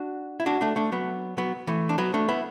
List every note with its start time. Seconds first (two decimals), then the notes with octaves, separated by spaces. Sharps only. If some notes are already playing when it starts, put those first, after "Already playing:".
Already playing: D4 F#4
0.40 E4
0.46 D4 F#4
0.61 A3 D4
0.76 A3 D4
0.92 F#3 B3
1.38 F#3 B3
1.67 E3 A3
1.89 D4
1.98 F#3 B3
2.14 A3 D4
2.29 B3 E4